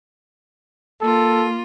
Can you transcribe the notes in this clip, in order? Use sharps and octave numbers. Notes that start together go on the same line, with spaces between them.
A#3 F4 A4